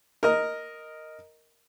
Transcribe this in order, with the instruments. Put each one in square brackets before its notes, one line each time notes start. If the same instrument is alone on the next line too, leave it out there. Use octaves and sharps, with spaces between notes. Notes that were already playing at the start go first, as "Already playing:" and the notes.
[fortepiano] A#4 D#5